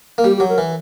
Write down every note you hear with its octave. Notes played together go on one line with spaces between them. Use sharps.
A#3
G3 G4
F#3 G4
A#4
E3